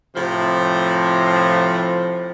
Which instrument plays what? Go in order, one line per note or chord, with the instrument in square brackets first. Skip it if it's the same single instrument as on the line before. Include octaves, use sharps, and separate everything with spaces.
[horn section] A2 C3 F3